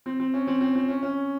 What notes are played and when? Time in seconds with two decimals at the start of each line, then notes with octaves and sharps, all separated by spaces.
0.06 C4
0.20 C4
0.34 C#4
0.47 C4
0.61 C4
0.75 C4
0.89 C#4
1.03 C#4